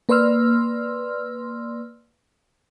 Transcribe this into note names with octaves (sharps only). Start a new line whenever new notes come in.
A#3 B4 D5 C6 E6 F6